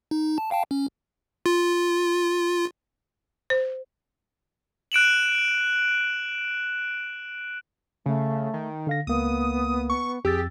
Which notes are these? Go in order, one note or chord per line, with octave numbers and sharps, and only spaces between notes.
D#4
A5
F5 G5 A5
C#4
F4
C5
F#6 D7 E7 F#7
C#3 A3
D#3
D3 F5 A#6
C#2 A#3 B3 D#6
C#6
F2 G4 G#4 E6 A6